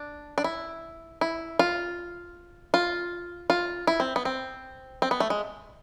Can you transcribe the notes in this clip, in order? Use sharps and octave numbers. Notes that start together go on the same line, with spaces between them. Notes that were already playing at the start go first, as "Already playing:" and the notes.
Already playing: D4
D4
E4
E4
F4
F4
F4
E4
C4
B3
C4
C4
B3
A3
G#3